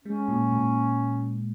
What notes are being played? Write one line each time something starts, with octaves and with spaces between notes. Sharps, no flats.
G#3 C#4
A#2
A#2